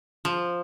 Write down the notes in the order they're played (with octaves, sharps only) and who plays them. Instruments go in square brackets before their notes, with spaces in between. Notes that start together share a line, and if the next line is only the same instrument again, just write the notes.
[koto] F3